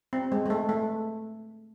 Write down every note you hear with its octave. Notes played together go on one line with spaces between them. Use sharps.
C4
G#3
G#3
A3
A3